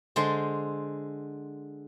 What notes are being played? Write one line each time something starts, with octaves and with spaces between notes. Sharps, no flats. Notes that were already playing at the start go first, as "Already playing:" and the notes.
D3 G#3 C5 C6